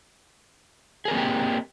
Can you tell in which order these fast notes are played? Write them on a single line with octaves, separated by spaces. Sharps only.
G#4 A#4 C4 A#3 G4